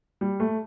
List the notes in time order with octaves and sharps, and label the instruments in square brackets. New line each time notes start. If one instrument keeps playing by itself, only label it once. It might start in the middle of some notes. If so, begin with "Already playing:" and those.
[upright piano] G3
A3